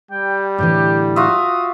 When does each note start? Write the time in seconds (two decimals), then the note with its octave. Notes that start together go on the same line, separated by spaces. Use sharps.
0.11 G3 G5
0.58 A2 D3 E3 G4
1.16 F4 F#4 E5 D#6